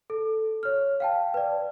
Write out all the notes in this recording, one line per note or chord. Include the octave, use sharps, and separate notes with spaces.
A4
C#5 F6
F5 G5 A5
B4 D5